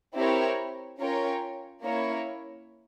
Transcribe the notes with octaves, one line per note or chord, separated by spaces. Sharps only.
C4 E4 G4 A#4 C#5
C#4 F4 A#4 C#5 G5
A#3 C#4 E4 A#4 C#5